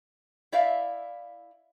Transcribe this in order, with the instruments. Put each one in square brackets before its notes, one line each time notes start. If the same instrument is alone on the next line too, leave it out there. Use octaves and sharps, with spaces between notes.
[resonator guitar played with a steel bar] E4 D5 E5 F5